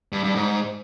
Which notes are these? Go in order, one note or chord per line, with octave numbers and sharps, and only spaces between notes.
G2
G2
G#2